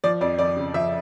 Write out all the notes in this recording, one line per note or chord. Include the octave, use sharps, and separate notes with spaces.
F3 D5
F2 D5
F2 D5
C#3
F3 E5